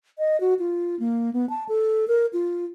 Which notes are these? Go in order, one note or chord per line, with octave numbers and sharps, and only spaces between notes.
D#5
F#4
F4
A#3
B3
A5
A4
A#4
F4